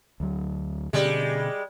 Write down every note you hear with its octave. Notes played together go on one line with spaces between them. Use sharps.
D2 F#3
B2 D3 G3 G#3 C#4